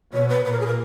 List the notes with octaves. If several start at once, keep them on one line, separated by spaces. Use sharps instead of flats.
B2 C#5
B4
A#2 B4
A#4
G#4
A#4